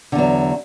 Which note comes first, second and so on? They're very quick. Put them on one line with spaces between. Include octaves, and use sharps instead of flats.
D3 E2 F#3